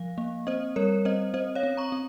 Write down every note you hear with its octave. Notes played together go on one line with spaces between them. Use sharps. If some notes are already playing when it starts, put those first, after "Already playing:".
Already playing: F3 F5
A#3
C4 C5 D#5
G3 A#4 C#5
C4 C5 D#5
C4 C5 D#5
C#5 F5
C4
A#5 C#6
C4